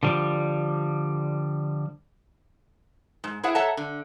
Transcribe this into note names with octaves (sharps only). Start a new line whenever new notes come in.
D3 F3 G3
G#2
E4 G#4 C5 E5 F#5
A4 C#5 E5 F#5 A5 A#5
D3